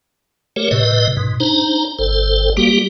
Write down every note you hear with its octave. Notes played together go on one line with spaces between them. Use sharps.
A3 G4 A#4 C#5
A2 C3 B4 D#5
G#2 B2
D4 D#4 C5 A#5
G1 A4 C5
G3 A#3 F#4 G4